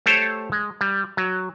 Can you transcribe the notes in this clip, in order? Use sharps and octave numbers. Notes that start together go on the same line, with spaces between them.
A3 G4 A4 C5 C#5
G#3
G3
F#3